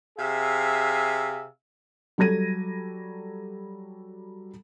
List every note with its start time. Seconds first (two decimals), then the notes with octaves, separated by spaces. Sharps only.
0.17 C3 G#4 E5 F5
2.18 F#3 G3 A4 G#6 A#6 D#7